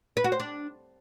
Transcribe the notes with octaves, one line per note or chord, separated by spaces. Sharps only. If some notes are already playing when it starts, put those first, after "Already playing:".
B4
F#4
C5
D4